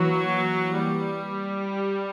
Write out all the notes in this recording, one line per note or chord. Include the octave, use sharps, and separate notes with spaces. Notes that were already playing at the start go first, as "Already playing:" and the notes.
Already playing: E3 F#3 A#3 E4 B4
G3